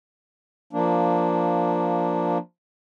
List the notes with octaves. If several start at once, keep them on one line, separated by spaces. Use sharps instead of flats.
F3 A#3 D4